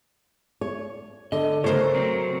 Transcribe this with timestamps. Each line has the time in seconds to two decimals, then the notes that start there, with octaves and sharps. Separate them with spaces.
0.61 C#5
1.32 D3 D#5
1.64 C#3 A3 A#4 C5 C#5
1.95 F#3 C4